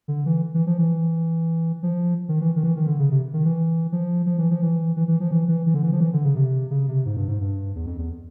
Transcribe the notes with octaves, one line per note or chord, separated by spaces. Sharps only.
D3
E3
E3
F3
E3
F3
D#3
E3
D#3
E3
D#3
D3
C#3
C3
D#3
E3
F3
F3
E3
F3
E3
E3
E3
F3
E3
E3
E3
D3
E3
F3
E3
D3
C#3
C3
C#3
C3
G#2
G2
G#2
G2
E2
F2
E2